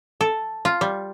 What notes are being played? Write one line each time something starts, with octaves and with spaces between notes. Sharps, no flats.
A4
F4
G3